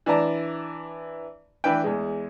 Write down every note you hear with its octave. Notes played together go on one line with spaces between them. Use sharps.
E3 D4 D5 A5 A#5
E3 D4 B4 G5
E2 G#3